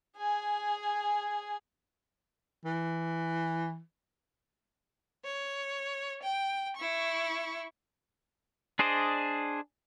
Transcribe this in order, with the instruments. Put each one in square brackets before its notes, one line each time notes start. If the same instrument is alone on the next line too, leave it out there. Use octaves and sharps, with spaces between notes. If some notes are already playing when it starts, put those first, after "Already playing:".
[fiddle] G#4 G#5
[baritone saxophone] E3
[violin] C#5
G5
E4 C#6
[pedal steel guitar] D4 G#4 C5 D5 D#5